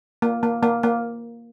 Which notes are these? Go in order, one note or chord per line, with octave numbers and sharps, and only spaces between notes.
A#3
A#3
A#3
A#3